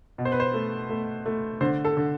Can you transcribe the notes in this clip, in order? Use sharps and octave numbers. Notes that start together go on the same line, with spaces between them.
B2
C5
B4
C5
A3
A3
A3
D3 C5
A4
D3